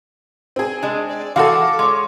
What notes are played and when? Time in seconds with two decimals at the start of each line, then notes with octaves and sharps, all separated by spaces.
0.56 C4 G#4
0.83 G#3 D4
1.09 D5
1.36 E3 G#3 F#4 A4 F5 D6
1.79 G#3 C#5